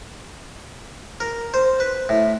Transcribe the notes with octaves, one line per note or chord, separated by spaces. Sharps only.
A#4
C5
B4
A2